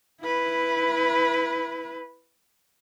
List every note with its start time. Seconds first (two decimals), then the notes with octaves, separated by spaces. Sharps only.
0.21 E4 B4